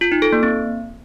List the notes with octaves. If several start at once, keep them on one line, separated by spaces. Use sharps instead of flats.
F4
D#4
A4
A#3
C4